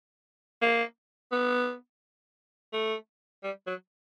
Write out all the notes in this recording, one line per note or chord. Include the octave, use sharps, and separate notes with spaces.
A#3
B3
A3
G3
F#3